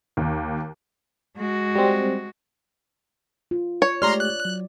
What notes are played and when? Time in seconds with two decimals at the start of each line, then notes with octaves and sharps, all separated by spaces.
0.17 D#2
1.37 G#3 F#4
1.75 G3 C4
3.51 F4
3.82 C#5
4.02 G#3 A3 G4 D5 A#5 C6 F6
4.20 F#6
4.45 F#3